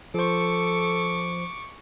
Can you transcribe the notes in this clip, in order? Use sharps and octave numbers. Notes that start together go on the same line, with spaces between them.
F3 A4 C5 C#6 D6